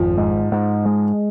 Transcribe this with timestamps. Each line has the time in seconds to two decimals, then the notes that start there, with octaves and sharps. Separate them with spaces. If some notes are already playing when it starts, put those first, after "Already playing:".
Already playing: G#1 F2 F3
0.17 G#2
0.52 G#2
0.86 G#3